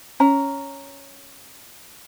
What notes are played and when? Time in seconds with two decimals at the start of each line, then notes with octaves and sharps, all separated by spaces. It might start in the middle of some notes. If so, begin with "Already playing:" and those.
0.20 C#4 A#5